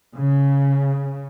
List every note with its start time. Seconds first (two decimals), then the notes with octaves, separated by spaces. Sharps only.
0.19 C#3